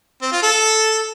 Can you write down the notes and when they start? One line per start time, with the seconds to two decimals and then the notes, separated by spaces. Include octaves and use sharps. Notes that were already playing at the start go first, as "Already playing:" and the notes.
0.22 C4
0.32 F4
0.43 A4